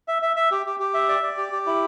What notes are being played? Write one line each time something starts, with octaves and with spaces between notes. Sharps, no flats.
E5
E5
E5
G4
G4
G4
E5
D5
D5
G4
G4
E4